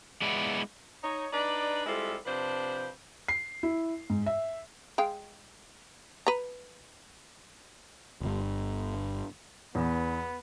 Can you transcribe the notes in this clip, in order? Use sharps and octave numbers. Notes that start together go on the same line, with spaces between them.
G#3 B3 E4 D5
D#4 C#5
D4 D#4 B4 D5
G3 G#3 C4 E4 F4 A4
C3 F3 D4 B4 C5
C7
E4
G#2
E5
G#3 F5 G5
B4 A#5
D1 G1
E2 B3